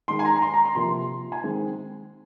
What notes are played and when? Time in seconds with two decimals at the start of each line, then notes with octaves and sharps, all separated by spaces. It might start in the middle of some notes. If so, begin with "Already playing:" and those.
0.08 D#3 G#3 D#4 C6
0.19 G#5
0.25 A#5
0.36 A#5
0.42 C6
0.54 A#5
0.65 C6
0.75 C3 F3 A#3 C6
1.32 G#5
1.43 D#3 G#3 C4 D#4